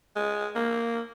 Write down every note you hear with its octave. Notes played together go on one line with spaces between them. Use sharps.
G#3
A#3